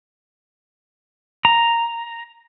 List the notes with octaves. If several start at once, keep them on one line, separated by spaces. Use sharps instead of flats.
A#5